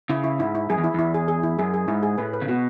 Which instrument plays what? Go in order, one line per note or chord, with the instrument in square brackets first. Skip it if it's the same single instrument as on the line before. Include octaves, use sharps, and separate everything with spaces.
[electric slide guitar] C#3 [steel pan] E4
[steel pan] E4
[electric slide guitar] G#2 [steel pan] E4
[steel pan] E4
[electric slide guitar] F#2 [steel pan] G#4
[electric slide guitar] E2
[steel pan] E4
[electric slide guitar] E2 [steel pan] E4
[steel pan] G#4
G#4
E4
[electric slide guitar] F#2 [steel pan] G#4
[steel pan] G#4
[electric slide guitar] G#2 [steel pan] E4
[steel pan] G#4
[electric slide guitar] A2 [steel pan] B4
[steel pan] B4
[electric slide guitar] C#3
[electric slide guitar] B2 [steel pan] F#4